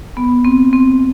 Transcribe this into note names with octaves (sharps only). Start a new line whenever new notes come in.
B3
C4
C4